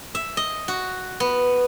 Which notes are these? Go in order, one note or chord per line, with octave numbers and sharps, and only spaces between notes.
E5
D#5
F#4
B3